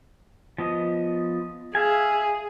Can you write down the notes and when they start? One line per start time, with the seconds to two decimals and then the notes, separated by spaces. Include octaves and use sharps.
0.58 F3 B3 D#5
1.75 G#4 E5 F5 G#5